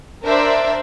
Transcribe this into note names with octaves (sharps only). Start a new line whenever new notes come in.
D4 A#4 C5 D5 E5